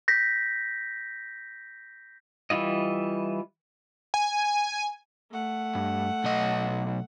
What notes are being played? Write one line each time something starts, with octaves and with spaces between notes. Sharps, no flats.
G6 A#6 B6
E3 G3 E4 F4 D#5
G#5
A3 F#5
G2
B1 D#5